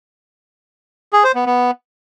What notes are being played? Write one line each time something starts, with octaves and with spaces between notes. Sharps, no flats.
G#4
C5
B3
B3